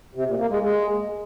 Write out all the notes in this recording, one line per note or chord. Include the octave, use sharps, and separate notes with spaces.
C3
A#2
A#3
G#3
G#3